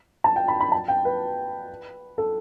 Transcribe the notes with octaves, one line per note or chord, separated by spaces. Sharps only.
A5
G5
B5
B5
A5
G5
B4
A4